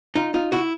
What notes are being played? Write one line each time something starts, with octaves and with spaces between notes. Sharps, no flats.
D#4 F4
D#4 F4
E4 F#4